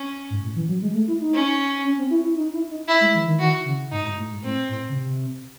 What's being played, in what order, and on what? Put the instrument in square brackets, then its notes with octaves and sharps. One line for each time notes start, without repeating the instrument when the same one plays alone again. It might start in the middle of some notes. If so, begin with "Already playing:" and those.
Already playing: [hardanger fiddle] C#4
[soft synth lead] G#2
A2
E3
F#3
G#3
A3
E4
D#4
[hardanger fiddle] C#4
[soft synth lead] C#4
C4
E4
E4
D#4
E4
D#4
[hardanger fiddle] E4
[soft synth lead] G#3
E3
D#3
[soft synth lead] D#3 [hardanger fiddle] F#4
[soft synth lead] C#3
[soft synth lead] G#2 [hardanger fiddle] D#4
[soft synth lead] G#2
A2
G#2
[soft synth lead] A2 [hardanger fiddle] C4
[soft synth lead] A2
C#3
C3